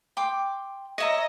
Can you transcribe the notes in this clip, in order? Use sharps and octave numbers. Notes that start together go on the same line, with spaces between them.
G5 C6 D6
C#5 D#5 E5 A#5